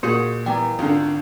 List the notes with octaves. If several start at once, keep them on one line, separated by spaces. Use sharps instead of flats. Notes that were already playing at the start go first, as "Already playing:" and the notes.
A#2 A#3 F#4 G#4 C5 C#7
E3 G3 B3 G5 A#5
G#1 D3 D#3 F4 A5